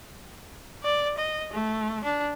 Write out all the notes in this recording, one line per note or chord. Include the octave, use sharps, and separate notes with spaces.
D5
D#5
A3
D4